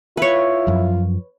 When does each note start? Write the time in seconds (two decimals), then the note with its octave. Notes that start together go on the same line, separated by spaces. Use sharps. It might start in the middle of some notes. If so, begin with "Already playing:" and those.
0.17 E4 F4 B4 C#5
0.67 F#2 F3